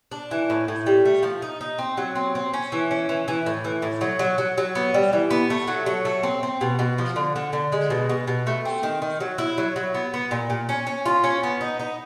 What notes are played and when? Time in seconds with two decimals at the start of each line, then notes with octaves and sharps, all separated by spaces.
0.12 D4
0.31 E3
0.50 A2
0.68 A2
0.86 G3
1.05 A3
1.23 F3
1.42 D#4
1.61 D#4
1.79 C4
1.97 F#3
2.15 C4
2.35 C4
2.54 C#4
2.72 E3
2.91 C#4
3.09 E3
3.28 E3
3.46 A2
3.64 E3
3.82 A2
4.01 F#3
4.19 F#3
4.38 F#3
4.58 F#3
4.75 B3
4.94 G3
5.13 E3
5.31 B3
5.50 A3
5.68 F#3
5.86 F#3
6.05 A3
6.23 C4
6.43 C4
6.61 B2
6.79 B2
6.98 F3
7.16 D3
7.36 D3
7.53 D3
7.72 G#3
7.90 B2
8.09 B2
8.28 B2
8.47 A3
8.65 C4
8.83 D#3
9.02 D#3
9.20 F#3
9.38 E4
9.58 F#3
9.76 F#3
9.94 B3
10.14 B3
10.31 A#2
10.50 A#2
10.69 C#4
10.87 C#4
11.06 F4
11.24 C#4
11.43 B3
11.61 D#4
11.80 D#4